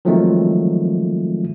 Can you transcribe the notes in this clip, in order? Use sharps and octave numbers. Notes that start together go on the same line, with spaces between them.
D#3 F3 F#3 G#3 A3 C4